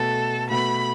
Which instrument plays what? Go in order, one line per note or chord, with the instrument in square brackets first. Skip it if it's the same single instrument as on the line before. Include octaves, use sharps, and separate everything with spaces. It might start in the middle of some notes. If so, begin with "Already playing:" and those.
Already playing: [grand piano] B2 A3 F#4 B4 [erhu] A4
[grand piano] B2 A3 F#4 B4 [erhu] B5